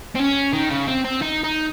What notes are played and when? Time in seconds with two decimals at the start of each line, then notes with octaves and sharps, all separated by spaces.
0.15 C4
0.20 C#4
0.53 D#3
0.70 C#3
0.87 C4
1.04 C4
1.21 D#4
1.44 D#4